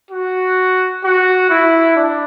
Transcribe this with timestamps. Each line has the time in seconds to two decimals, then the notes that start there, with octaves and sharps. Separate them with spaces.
0.11 F#4
1.04 F#4
1.50 E4
1.97 D4